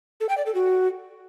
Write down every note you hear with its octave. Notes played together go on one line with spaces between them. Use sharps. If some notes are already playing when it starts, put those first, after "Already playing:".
A4
G5
D5
A4
F#4